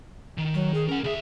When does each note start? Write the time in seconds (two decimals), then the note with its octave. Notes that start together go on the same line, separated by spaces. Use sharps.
0.38 D#3
0.54 F#3
0.74 G#4
0.89 C#4 A#4 F#5
1.04 C#2 G#4 E5